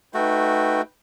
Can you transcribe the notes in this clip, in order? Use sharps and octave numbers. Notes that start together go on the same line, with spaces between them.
A3 D#4 F#4 B4 G5